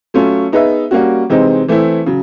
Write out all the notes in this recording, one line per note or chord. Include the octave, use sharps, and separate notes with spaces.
F#3 A3 C#4 F4
B3 D#4 G#4 B4 E5
G3 A#3 C#4 F#4
C3 E3 G#3 C4 D#4
E3 A3 C4 E4
C#3 F#3